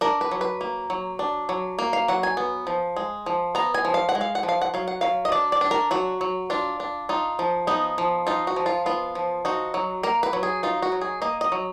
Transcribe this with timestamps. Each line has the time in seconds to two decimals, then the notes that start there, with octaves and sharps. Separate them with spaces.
0.01 D4 A#4
0.21 B4
0.31 F#3
0.41 B4
0.61 A#3
0.90 F#3
1.19 D4
1.49 F#3
1.79 A#3
1.93 F5
2.08 F#3 F#5
2.23 G#5
2.37 B3
2.67 F3
2.96 G#3
3.26 F3
3.55 B3 A#5
3.74 G#5
3.85 F3
3.94 F5
4.09 F#5
4.15 G#3
4.21 F5
4.35 F#5
4.43 F3
4.49 F5
4.61 F#5
4.74 F#3 F5
4.88 F#5
5.01 F#3 F5
5.25 D#5
5.32 D4 D5
5.52 D5
5.61 D4
5.71 A#4
5.91 F#3 F#4
6.21 F#3
6.50 D4 F4
6.80 D4
7.09 D#4 F4
7.39 F3
7.67 B3 D#4
7.98 F3
8.27 D#4 F4
8.47 F#4
8.56 F3
8.66 F4
8.86 B3 F4
9.15 F3
9.45 D#4 F#4
9.74 F#3
10.03 A#3 A#4
10.23 B4
10.33 F#3
10.43 G#4
10.63 D#4 F4
10.82 F#4
10.92 F#3
11.01 G#4
11.22 A#3 D#5
11.41 D#5
11.52 F#3